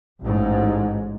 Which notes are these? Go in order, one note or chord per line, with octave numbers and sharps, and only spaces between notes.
A1 G#2